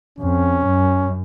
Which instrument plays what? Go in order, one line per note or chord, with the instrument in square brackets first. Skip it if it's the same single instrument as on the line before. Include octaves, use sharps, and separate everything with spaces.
[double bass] F2 [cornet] C#4
[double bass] F#2